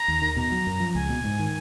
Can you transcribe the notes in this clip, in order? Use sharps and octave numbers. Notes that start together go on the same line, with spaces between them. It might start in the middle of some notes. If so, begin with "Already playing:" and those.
Already playing: A#5
D#2
D#3
B2 A#5
F#3
F#2
F3
C#2 G#5
B2
G#2
D#3